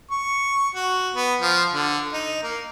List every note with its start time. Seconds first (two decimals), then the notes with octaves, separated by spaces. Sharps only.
0.11 C#6
0.75 F#4
1.15 B3
1.41 F3
1.72 D3
2.13 D#4
2.43 A#3